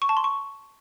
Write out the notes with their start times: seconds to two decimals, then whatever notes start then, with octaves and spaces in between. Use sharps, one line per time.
0.02 C#6
0.09 A5
0.17 C6
0.24 C#6